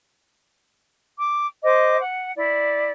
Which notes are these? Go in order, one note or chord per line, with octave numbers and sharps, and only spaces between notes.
D6
C5 D#5 D6
F#5
E4 D5